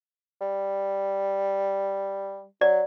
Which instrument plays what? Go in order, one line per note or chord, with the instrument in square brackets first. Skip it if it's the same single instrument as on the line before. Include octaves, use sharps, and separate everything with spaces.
[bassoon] G3
[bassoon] F#3 [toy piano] D5